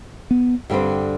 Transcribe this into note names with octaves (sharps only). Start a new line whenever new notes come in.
B3
G2 D3 G3 C4